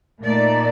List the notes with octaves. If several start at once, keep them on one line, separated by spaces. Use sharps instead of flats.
A#2 A3 D#4 D5